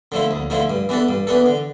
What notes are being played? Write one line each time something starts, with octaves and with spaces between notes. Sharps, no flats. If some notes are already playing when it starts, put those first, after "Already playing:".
D3 F3 A3 E4
D2
D3 F3 A3 E4
G2
E3 B3 D4 A4
G2
E3 B3 D4 A4
D3